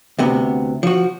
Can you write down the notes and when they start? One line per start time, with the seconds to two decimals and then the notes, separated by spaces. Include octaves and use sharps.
0.19 D2 C3 B3
0.83 F3 F#4